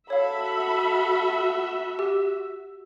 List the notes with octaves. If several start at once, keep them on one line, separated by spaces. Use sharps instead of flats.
F#4 A4 C#5 E5 F5 B5
G4